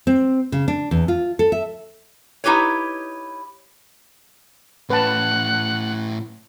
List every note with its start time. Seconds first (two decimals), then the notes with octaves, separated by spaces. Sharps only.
0.07 C4
0.52 C#3
0.68 D4
0.91 E2
1.08 F4
1.39 A4
1.52 E5
2.44 D#4 E4 G4 B4 C#5
4.90 A2 C#4 B4 F#5 A5